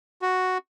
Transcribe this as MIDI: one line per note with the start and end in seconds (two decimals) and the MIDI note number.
0.22 0.58 66